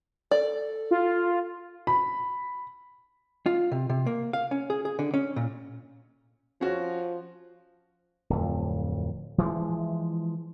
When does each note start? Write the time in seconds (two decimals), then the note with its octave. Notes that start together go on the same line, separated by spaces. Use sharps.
0.31 A4 D5
0.91 F4
1.87 B5
3.46 F4
3.72 C3
3.89 C3
4.06 A#3
4.33 F5
4.51 C#4
4.70 G#4
4.85 G#4
4.99 D3
5.14 C#4
5.36 A#2
6.61 F3 C#4 F#4
8.30 D1 F2
9.38 E3 F3 G#3